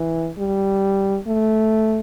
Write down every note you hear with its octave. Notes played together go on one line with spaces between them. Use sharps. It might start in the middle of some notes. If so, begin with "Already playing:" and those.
Already playing: E3
G3
A3